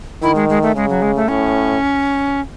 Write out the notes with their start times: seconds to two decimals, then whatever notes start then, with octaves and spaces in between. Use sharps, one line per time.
0.22 D#3 E4
0.35 G#3
0.49 G#3
0.62 A3
0.75 C#3 G#3
0.89 F#3
1.02 G#3
1.16 A3
1.28 A2 C#4